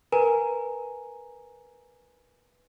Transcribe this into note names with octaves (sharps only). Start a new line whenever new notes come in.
A#4 B4 G#5 A#5